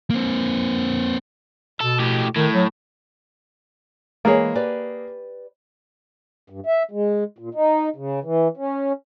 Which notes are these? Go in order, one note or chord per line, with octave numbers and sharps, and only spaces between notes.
A#3 C4
B2 A4
A2 G4
A2 D#3
F#3
E3 G#3 A#3 G#4 C#5
G4 B4 D5
G2
E5
G#3
A#2
D#4
C#3
E3
C#4